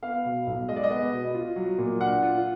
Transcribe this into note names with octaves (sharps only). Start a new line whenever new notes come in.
B3 F5
B2
B1
G#3 D#5
D5
D#5
B3
B2
F4
F#3
A#2
D4 F#5
F4